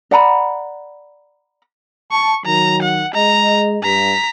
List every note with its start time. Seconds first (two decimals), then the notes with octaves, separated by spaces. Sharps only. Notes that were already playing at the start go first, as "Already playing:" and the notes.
0.11 D5 F#5 A#5 B5
2.12 A5 C#6
2.46 D#3 F#3 A#5
2.82 F#5
3.14 G#3 D#5 A#5
3.83 G2 A#5 B6